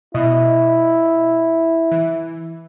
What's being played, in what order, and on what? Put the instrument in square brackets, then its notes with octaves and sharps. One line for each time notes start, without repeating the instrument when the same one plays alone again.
[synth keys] B2 D#5 [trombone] E4
[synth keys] E3